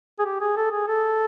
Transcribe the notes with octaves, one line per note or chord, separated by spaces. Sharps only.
G#4
G4
G#4
A4
G#4
A4